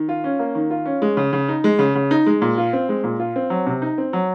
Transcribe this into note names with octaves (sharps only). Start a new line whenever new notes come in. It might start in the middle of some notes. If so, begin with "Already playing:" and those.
Already playing: D#3
F4
C#4
A#3
D#3
F4
C#4
G#3
C#3
C#3
D#4
G#3
C#3
C#3
D#4
G#3
A#2
F4
C4
G#3
A#2
F4
C4
F#3
C3
D#4
C4
F#3